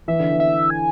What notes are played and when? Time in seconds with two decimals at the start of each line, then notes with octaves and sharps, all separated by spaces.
0.08 E3 E5
0.20 D3
0.32 E3
0.40 E5
0.70 G#5